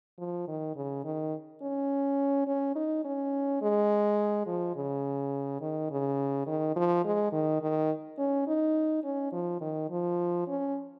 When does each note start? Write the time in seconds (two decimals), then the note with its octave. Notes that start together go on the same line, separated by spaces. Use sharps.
0.18 F3
0.47 D#3
0.76 C#3
1.04 D#3
1.62 C#4
2.47 C#4
2.76 D#4
3.04 C#4
3.62 G#3
4.47 F3
4.76 C#3
5.61 D#3
5.91 C#3
6.47 D#3
6.76 F3
7.04 G#3
7.32 D#3
7.61 D#3
8.18 C#4
8.47 D#4
9.04 C#4
9.32 F3
9.61 D#3
9.90 F3
10.47 C#4